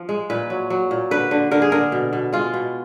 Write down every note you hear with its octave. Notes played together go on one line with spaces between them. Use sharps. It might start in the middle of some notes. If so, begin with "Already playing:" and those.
Already playing: F3
G#3
A#2 B4
F#3
F#3
A#2
D3 B4
D3
D3 A#4
G#4
D3 A#4
B2
B2
G#3 F4
B2